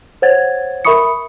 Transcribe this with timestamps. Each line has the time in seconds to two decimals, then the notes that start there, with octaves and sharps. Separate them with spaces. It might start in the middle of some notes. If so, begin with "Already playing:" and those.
0.22 C5 C#5 F#5 G#6 A6
0.85 A#4 E5 B5 C#6 D#6 C#7